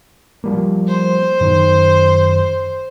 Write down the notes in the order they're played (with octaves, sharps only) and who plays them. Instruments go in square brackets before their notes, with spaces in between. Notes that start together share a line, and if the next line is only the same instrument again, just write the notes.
[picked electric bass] F3 G3 A#3
[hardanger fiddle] C5
[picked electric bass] F#2 D#3